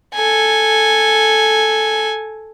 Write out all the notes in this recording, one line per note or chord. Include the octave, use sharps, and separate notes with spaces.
A4 G#5